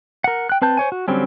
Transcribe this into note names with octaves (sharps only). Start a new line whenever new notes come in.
A#4 F#5
G5 F#6
C4 B4 A5 G6
C5 C#5 G#5
F#4
D3 F#3 G3 C4 C#4